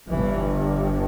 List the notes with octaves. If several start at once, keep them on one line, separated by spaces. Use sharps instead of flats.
G1 G2 E3